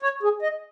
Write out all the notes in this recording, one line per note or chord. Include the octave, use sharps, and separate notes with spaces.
C#5
G#4
D#5